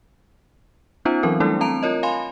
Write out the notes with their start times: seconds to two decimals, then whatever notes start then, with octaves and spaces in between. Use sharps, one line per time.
1.05 B3 C#4 D#4 F4 C5
1.23 E3 F#3 C4 A#4
1.40 G3 A3 D4 E4 A4
1.61 C4 A5 A#5 D7 F7
1.83 F4 A#4 C#5 D#5
2.03 F5 G#5 B5 C6